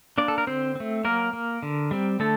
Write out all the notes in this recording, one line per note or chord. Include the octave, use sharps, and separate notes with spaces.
A#3 D4 D5
A4
A#4
D3 C4 C5
A3 C4
F#3 A#3 A#4
A#3
D3
G3 C4
D3 A3 A4